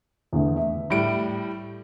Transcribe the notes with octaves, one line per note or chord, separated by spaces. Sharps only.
E2 D3 A3
E5
A2 G3 D7